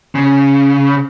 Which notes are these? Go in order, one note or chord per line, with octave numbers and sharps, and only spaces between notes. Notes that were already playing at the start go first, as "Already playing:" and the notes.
C#3